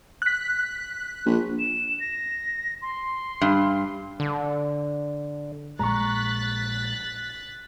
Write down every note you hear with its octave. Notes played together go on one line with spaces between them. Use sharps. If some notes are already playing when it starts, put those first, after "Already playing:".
F#6 B6
A#1
E7
A#6
C6
G2
D3
A#1 A#2 G#3 A#5 C#6 F#6 A6 B6